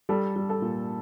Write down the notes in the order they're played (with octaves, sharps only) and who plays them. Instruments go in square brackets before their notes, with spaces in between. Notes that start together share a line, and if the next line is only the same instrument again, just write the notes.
[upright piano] G3 A4
G3
A4
A#2